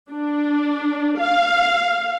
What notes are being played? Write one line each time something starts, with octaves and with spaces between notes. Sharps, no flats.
D4
F5